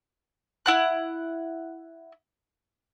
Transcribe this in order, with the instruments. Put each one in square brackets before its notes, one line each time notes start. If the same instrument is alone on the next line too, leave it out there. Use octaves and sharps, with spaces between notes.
[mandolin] E4 F#5 F#6